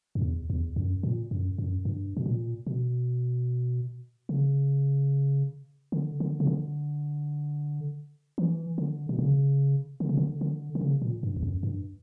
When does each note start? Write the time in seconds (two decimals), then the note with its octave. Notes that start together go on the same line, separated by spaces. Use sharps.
0.15 F#2
0.22 E2
0.50 E2
0.76 F#2
1.03 A#2
1.31 F#2
1.58 F#2
1.85 G2
2.17 B2
2.26 A#2
2.67 B2
4.29 C#3
5.92 D3
6.20 D3
6.40 C#3
6.47 D3
8.38 E3
8.78 D3
9.09 B2
9.19 C#3
10.00 D3
10.09 C#3
10.18 D3
10.41 D3
10.75 D3
10.81 C#3
11.02 A#2
11.23 G2
11.36 E2
11.43 F#2
11.63 G2